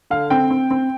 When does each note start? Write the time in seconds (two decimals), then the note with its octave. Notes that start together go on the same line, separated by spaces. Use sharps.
0.10 D3 F5
0.30 C4 G5
0.50 C4
0.71 C4